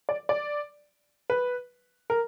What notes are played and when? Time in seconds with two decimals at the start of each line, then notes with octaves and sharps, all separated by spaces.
0.09 D5
0.29 D5
1.30 B4
2.10 A#4